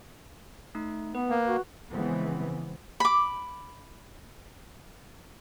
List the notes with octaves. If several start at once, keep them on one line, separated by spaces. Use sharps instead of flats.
A3 D#4
B3 B4
A#3
F#4
C#3 E3 F3 G#3 B3 C4
B5 D6